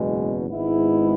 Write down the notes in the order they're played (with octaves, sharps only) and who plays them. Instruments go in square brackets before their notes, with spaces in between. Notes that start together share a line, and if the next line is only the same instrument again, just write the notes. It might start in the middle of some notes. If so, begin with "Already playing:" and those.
Already playing: [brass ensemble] F#1 E2 B2 G#3
G#1 G#2 G#3 B3 E4